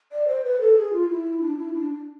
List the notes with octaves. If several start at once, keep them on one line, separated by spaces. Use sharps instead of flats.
D5
C5
B4
A4
G#4
F4
E4
D4
E4
D4
D4